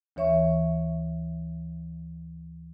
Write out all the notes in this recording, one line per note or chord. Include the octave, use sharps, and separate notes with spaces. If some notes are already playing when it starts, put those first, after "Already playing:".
D2 E3 C#5 E5 C#6